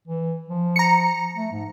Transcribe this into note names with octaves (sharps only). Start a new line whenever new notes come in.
E3
F3
A#5 C#7
A3
G#2